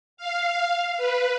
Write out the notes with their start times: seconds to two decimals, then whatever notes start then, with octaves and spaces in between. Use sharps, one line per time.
0.17 F5
0.97 B4